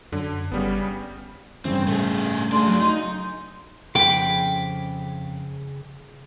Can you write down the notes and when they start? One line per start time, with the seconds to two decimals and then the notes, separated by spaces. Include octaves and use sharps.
0.12 F#2 D3
0.52 G1 C#3 G3 B3
1.65 G2 C#3 E3 C4
1.88 A2 A3 G#4
2.52 A3 D4 G#4 C6
2.66 F#3
2.81 D#4
3.95 F2 C#3 G5 B5 D6